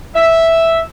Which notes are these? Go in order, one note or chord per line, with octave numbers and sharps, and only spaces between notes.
E5